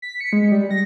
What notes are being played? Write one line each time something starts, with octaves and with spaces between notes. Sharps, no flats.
B6
C#7
G#3
G3
A#6